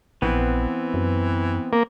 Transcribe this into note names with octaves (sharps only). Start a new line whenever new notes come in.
A#1 E3 B3 C4
F#2
A#3